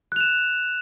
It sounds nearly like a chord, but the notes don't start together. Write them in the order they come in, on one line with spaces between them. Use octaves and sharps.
F#6 F7 E7